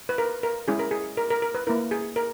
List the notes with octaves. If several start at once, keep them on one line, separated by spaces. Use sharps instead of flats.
B4
A#4
A#4
G#3 C#4 E4 G#4
A#4
G#4
A#4
A#4
A#4
B4
A#3 E4 A#4
G#4
A#4